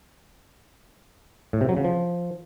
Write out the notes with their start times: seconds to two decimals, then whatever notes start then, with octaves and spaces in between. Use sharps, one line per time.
1.53 A2
1.61 C3
1.69 F#3
1.77 C#3
1.84 F3